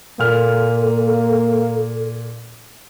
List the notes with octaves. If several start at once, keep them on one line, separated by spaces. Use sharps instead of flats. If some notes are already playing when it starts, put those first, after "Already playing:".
A#2 A#3 A4 F6